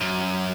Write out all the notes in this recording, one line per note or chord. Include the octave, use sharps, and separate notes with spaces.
F#2